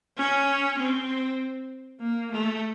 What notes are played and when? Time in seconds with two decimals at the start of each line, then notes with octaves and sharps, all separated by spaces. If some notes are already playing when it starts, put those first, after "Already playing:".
0.17 C#4
0.78 C4
2.00 A#3
2.31 A3